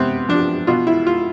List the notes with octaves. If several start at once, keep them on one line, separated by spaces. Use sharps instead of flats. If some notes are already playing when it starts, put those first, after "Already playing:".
Already playing: C3 B3 C4
F3 D4
B2 F4
E4
F4